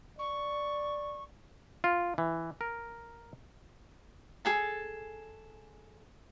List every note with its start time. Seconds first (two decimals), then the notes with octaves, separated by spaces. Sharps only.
0.19 D5 C#6
1.84 F4
2.18 E3
2.61 A#4
4.45 G#4 A4 A5